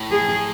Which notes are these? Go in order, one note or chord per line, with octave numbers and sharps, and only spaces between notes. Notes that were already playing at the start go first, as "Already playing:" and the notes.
Already playing: A2
G#4